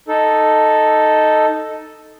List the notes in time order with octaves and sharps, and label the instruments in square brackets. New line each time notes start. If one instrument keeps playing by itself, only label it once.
[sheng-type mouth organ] D#4 A4